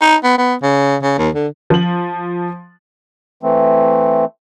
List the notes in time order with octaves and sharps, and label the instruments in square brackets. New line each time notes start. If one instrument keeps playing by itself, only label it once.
[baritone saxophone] D#4
B3
B3
C#3
C#3
D#2
D3
[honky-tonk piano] F3 F#7
[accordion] E3 A3 C4